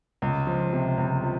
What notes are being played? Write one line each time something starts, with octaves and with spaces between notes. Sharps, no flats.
C#2
F3
C3
C#2
F3